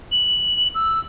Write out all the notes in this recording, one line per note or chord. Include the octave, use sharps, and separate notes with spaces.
F#7
E6